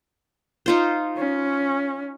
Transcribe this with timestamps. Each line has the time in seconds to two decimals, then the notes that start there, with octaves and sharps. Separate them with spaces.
0.66 D#4 F4 C5
1.17 C#4